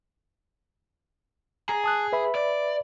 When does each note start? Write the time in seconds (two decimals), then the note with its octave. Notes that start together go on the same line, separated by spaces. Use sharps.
1.69 G#4 A#5
1.84 A5 D#6 F#6
2.13 B4 E5 B5
2.35 D5